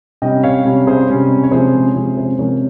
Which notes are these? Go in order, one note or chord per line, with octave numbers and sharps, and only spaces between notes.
C3 G3 C#4 D#5 G5
C#5 F5
C3 G3 C#4
G#4 C5
C3 G3 C#4
C#5
C3 F3 G#3 C#4 G#4 C5
C3 F3 G#3 C#4
G#4 C5
C3 F3 G#3 C#4 A#4 C#5